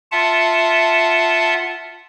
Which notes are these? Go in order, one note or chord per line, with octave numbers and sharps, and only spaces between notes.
F4 E5 F#5 A5